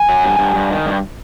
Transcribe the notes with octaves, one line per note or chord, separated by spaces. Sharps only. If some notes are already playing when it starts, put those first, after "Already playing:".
Already playing: G#5
F#3
G2
G2
G2
D#3
G2